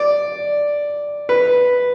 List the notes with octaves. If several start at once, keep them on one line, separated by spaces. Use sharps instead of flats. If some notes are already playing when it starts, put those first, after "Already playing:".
Already playing: D5
B4